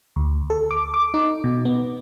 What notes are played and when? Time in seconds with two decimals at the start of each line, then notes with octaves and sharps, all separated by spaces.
0.16 D2
0.50 A4
0.71 D6
0.94 D6
1.14 D#4
1.44 B2
1.65 B3